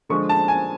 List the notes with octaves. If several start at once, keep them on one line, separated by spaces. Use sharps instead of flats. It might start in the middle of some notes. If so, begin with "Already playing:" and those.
D3 F3 G#3 C#6
A5
G#5